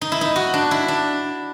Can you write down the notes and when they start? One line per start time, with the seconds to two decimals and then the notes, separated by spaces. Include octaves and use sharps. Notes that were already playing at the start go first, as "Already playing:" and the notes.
0.01 D#4
0.12 E4
0.21 D#4
0.36 F#4
0.54 D4
0.71 E4
0.88 D4